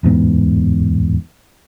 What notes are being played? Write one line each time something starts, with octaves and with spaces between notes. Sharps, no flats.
D1 E2 G#2 B3